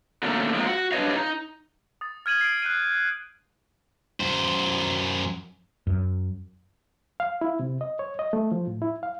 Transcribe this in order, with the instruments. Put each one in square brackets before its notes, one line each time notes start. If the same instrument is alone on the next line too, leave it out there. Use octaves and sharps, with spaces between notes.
[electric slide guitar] B2 D#3 A3 A#3 C#4 D4
F3 G#3 A#3 C4 D4 F4
F#4 F#5
D4 G4 B4 C#5 D#5 F5
D#4
[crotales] D#6 A6
F6 G#6 D#7 F#7
C7 D7
F#6 G6 C7 D#7
[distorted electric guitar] F#2 C5
[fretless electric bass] F#2
[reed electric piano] F5
E4
C3
D#5
C#5
D#5
A3
F3
A2
E4
F5